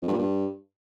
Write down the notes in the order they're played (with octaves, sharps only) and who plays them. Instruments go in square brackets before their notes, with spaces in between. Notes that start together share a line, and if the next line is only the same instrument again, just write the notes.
[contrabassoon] F2
G2
A#2
G2